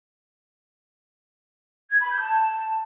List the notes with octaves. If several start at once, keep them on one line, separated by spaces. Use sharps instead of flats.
G#6
B5
G6
A5